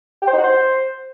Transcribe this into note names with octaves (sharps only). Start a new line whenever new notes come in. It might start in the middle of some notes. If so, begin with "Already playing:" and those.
G4
C5
D#4
F#4
C5